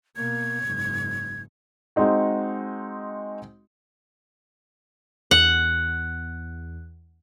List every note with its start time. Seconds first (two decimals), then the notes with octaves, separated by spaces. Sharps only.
0.16 B2 A#3 G#6
0.64 F#1 G#2
1.96 G#3 C4 D#4 F#4
5.31 E2 F#5